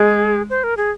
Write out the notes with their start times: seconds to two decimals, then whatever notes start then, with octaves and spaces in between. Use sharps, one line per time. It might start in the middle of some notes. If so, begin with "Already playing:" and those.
Already playing: G#3 G#4
0.50 C5
0.64 A#4
0.77 G#4